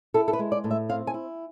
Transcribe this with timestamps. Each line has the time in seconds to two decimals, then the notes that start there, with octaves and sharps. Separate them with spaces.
0.14 E4 A4
0.28 A4
0.33 B4
0.39 G#3
0.52 D5
0.64 A2
0.71 E5
0.89 C4 F5
1.07 G#5
1.14 E4